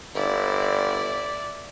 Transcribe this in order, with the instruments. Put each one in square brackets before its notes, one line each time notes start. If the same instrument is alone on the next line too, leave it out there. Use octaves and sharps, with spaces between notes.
[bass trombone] G1 [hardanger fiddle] E4 D5